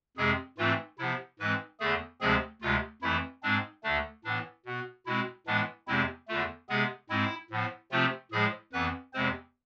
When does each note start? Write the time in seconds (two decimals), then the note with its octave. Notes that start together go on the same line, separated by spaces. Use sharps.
0.17 F2 C3 G#3 C4 G#4
0.58 G#2 E3 A3 C4 F4
0.98 C3 F3 B3 E4
1.39 G#2 E3 G#3 C4 B4
1.80 E2 D3 A3 G#4
2.21 D2 C3 F3 G#3 C4 G#4
2.62 D2 C3 G#3 F4
3.02 F2 E3 A3 E4
3.43 G#2 G#3 C4 D4
3.83 D2 D3 A3 D4
4.24 A2 E3 B3 D4
4.65 B2 B3
5.06 B2 G#3 C4 E4
5.47 A2 E3 G#3 B3 D4
5.87 E2 C3 G#3 C4 E4
6.28 E2 D3 A3 F4
6.69 C3 G#3 B3 G#4
7.10 G#2 G#3 C4 E4
7.50 A2 F3 B3
7.91 C3 F3 A3 C4 F4
8.32 A2 F3 G#3 G#4
8.73 F2 E3 B3 B4
9.13 E2 C3 G#3 C4 C5